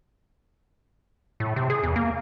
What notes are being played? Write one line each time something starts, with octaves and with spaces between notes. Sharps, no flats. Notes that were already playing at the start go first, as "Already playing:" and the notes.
A2
C3
G#4
E2
A#3